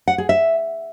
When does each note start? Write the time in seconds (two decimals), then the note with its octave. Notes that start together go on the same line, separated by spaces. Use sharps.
0.08 F#5
0.18 G#4
0.29 E5